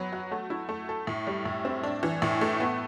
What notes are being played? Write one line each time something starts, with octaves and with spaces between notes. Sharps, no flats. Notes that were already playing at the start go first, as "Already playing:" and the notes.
Already playing: F#3 B3 B4
F#4
A3
E4
A3
A4
A2
G3
A2
C4
D4
E3
A2
A3
B3